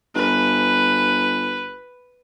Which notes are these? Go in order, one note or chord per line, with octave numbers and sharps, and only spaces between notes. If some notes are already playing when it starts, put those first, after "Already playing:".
G1 B4